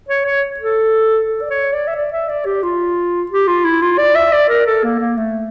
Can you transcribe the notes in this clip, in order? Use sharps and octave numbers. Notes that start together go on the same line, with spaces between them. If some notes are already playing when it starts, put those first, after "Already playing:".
C#5
C#5
A4
A4
D5
C#5
D5
E5
D5
E5
D5
G4
F4
G4
F4
E4
F4
D5
E5
D5
A#4
A4
A#3
A#3
A3